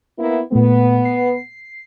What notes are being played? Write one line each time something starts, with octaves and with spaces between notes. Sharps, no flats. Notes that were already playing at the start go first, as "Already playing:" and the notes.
A#3 B3 E4
A#2 A3 B3
C7